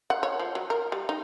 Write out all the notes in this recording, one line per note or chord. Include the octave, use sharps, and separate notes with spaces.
F#5
C#5
F3
F#3
A#4
G3
D#4